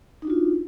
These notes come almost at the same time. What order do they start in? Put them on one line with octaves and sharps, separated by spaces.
D#4 D4 F#4 F4